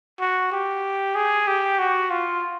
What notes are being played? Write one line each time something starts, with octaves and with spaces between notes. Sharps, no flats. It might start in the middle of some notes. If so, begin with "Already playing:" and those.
F#4
G4
G#4
G4
F#4
F4